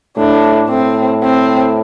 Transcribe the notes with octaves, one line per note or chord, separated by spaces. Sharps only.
A2 D4
A2 C4
C4